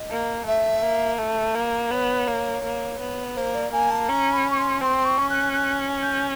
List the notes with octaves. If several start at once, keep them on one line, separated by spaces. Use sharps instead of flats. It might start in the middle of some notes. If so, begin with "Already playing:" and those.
Already playing: D#5
A#3
A3 E5
A#3
A3
A#3
B3 C#5
A#3
A#3
B3
A#3 C5
D5
A#3 G#5
A5
C#4 A#5
B5
C#6
C6
C4 C6
C#6
C#4
F#6
F#6
G6